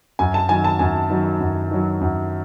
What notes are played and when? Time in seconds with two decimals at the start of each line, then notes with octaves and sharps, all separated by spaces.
0.19 F#2 G#5
0.34 A5
0.49 D#3 F#3 G#5
0.64 A5
0.79 F#2 G#5
1.10 D#3 F#3
1.40 F#2
1.71 D#3 F#3
2.01 F#2